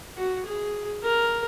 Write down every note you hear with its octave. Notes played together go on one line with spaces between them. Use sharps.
F#4
G#4
A#4